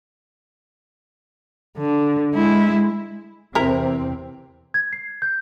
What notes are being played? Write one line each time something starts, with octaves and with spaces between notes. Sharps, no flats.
D3
G#3 E4
E2 C3 C4 E4 A#4
G#6
C7
G6